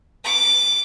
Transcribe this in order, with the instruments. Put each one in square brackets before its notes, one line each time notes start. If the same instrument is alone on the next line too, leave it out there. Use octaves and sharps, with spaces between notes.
[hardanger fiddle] D6